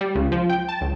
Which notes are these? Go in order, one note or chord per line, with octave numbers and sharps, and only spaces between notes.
G3
C#2
F3
G5
A5
C#2